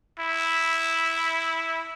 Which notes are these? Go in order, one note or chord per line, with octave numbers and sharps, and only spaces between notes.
E4